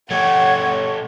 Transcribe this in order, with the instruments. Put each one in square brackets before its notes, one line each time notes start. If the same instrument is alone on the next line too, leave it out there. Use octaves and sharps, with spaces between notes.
[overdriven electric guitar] A3 G4 [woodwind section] C#5 [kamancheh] F#5 [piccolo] G#6